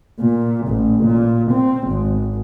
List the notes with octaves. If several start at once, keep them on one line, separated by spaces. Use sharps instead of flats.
A#2
A1
A#2
C4
G#1